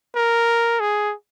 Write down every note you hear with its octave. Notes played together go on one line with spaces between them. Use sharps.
A#4
G#4